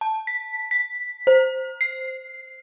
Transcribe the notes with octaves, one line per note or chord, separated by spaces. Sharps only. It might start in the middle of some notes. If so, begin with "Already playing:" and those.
A5
B6
B6
C5
C7